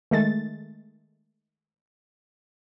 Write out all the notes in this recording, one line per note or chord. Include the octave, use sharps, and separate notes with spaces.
D#3 G#3 A3 A6